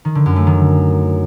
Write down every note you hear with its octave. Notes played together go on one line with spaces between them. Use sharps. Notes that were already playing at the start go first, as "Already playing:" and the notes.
D#3
D3
F#2
A3
D#3